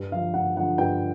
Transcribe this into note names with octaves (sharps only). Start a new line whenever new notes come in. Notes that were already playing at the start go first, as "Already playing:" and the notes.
Already playing: G2
D3 F3 F5
G2 F#5
D3 F3 F#5
G2 G5